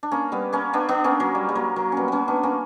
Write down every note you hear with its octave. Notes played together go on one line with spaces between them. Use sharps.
D4
A#3 C#4
G3 B3
A#3 C#4
B3 D4
B3 D4
A#3 C#4
F#3 A#3
G3
G3
F#3 A#3
F#3 A#3
G3 B3 C#4
A#3 B3 C#4
B3 D4
A#3 C#4